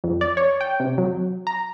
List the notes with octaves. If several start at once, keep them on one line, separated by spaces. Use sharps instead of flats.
F2
D5
C#5
G5
C3
F#3
A#5